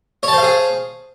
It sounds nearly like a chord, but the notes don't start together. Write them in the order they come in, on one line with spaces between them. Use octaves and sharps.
C#5 A5 C5 F5 G#4